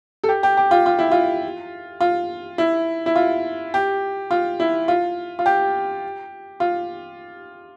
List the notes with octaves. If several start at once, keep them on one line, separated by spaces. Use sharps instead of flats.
A4
G4
G4
G4
F4
F4
E4
F4
F4
E4
E4
F4
G4
F4
E4
F4
F4
G4
F4